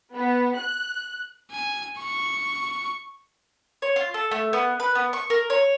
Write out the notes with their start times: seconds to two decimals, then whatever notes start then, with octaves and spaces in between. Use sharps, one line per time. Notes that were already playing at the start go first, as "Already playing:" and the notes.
0.14 B3
0.55 F#6
1.51 G#5
1.98 C#6
3.82 C#5
3.96 F4
4.14 A4
4.31 A3
4.53 B3
4.80 B4
4.95 B3
5.13 C#6
5.30 A#4
5.50 C#5